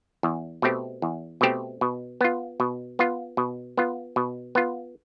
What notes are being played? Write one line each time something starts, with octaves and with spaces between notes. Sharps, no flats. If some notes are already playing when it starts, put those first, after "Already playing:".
E2
B2 A3 C4 G4
E2
B2 A3 C4 G4
B2
B3 F4
B2
B3 F4
B2
B3 F4
B2
B3 F4